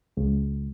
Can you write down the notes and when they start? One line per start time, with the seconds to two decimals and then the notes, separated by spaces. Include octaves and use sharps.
0.17 C#2